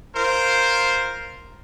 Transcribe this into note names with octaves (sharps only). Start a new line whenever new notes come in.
F4 A#4 C5